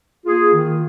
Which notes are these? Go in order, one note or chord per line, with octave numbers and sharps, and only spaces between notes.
A#3 F4 G#4
D#3